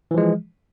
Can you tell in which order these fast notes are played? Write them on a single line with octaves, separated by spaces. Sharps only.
E3 F3 G#3